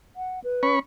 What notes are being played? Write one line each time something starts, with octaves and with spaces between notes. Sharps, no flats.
F#5
B4
C#4 B5 C#6